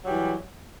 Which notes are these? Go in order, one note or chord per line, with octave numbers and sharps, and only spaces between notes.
E3 F#3 G3